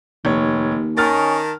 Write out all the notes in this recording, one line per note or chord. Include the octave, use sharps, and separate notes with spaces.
F1 D#2 C#5
D#3 C#4 A5 F6 A6